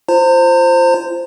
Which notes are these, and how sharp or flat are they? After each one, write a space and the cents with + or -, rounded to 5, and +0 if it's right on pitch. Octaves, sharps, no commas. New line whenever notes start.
F4 -25 C5 +0 A#5 -40